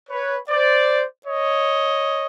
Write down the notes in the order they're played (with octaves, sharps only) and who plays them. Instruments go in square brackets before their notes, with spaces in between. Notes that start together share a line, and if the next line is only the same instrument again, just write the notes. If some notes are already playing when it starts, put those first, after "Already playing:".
[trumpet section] B4 C#5
C5 D5
C#5 D#5